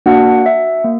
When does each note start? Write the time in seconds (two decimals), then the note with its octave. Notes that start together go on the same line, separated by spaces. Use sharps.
0.06 A#3 D4 F#4 F#5
0.46 E5
0.84 A#3